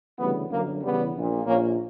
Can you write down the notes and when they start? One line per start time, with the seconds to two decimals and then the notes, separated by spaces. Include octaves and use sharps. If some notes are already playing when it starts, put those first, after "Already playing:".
0.18 D2 C#3 E3 G3 B3
0.51 G1 F#2 D3 F#3 A#3
0.82 E2 C#3 E3 G3 B3
1.14 A#1 A#2
1.46 A#1 A#2 A#3 C#4